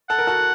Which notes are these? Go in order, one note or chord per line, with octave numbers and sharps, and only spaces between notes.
A4 F#5
A#4
F#4 A4